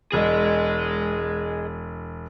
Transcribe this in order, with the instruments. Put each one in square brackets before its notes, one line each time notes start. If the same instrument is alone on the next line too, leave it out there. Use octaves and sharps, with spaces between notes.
[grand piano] E1 [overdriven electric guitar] G#4 D#5